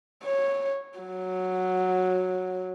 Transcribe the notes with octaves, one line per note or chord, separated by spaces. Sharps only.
C#5
F#3